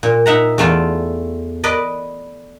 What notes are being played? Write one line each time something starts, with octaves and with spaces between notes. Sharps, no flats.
A#2
D#4 E5 F#5 A#5
E2 A3 F4 D5
B4 D5 D#5